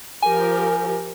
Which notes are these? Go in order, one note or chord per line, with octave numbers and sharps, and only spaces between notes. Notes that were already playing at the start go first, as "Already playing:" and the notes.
F3 G4 A#4 G#5